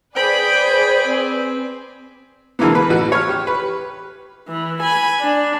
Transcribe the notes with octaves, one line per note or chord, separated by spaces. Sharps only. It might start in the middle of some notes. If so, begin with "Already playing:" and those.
G#4 B4 C5 D5 G5 B5
C4
B2 D3 E3 G#3 A#3 B3
B4
A1 F#4
C#5 F6
G4
B4
E3
G#5 B5
D4